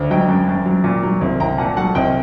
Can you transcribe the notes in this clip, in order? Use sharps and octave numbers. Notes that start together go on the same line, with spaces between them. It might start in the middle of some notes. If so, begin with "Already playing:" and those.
Already playing: D2
F#3 D#5 G5
F#2
F#2
F#3
A#2
F#3
C2
C2 G5 A#5
A#2 F#5 A5
F#3 F#5 A5
C2 D#5 G5